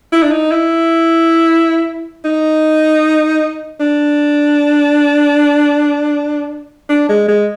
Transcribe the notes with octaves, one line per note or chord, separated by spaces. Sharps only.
E4
D4
D#4
E4
D#4
D4
D4
G#3
G#3